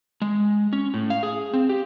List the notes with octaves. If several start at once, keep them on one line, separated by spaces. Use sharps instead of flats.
G#3
C#4
A2
F5
G#4
C4
G4